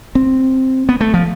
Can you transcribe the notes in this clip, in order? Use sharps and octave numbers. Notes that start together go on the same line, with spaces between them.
C4
B3
A3
F3